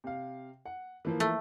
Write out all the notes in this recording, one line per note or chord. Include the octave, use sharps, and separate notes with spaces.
C3 F5
F#5
E3 F3 A#3
A3